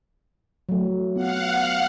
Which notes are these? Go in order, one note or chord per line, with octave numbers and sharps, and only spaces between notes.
F#3 A3
B3 F4 F5 F#5